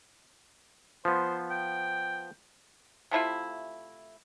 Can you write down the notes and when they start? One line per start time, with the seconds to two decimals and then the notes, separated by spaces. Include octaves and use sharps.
1.05 F3 B3 C5
1.51 G5
3.11 C3 A3 E4 F4